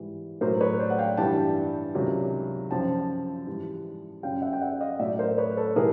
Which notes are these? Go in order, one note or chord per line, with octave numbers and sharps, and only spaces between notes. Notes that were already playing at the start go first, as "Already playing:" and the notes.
Already playing: G#2 E3 G3
A2 F#3 A#4 C5
B4 C#5
C5 D5
F#5
F5 G5
G2 E3 G3 G5 A5
C#2 C3 D#3 F#3
F#2 C#3 F3 G5 A5
G#2 E3 G3
F#2 C#3 F#3 F5 G5
E5 F#5
G5
E5 F#5
D#5 F5
A2 F#3 D5 E5
A#4 C5
B4 C#5
A4 B4
A2 E3 G3 G#4 A#4